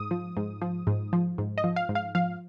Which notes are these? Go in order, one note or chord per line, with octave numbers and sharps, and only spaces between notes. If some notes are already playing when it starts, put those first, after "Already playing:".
Already playing: G#2 D#6
F3
G#2
F3
G#2
F3
G#2
D#5
F3
F5
G#2
F5
F3 F5